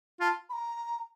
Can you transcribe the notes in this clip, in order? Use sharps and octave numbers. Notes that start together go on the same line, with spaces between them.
F4 A5
B5
A#5